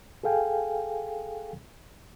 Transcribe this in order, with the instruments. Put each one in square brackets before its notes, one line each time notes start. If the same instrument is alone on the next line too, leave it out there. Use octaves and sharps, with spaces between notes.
[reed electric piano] G#4 A4 F5 G5 G#5